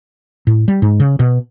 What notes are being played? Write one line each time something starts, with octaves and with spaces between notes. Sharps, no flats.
A2
G3
G#2
C#3
B2